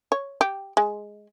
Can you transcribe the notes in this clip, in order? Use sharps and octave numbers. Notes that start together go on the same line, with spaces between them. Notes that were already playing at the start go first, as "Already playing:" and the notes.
C#5
G4
G#3